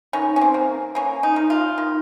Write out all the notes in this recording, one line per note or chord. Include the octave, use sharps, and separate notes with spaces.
D#3 C#4
C#4
C4
A#3
A#3 C#4
D#4
D#3
F4
D#3